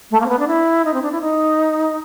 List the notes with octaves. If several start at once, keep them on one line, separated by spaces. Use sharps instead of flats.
A3
A#3
C4
B3
D4
E4
D#4
C4
D4
E4
D#4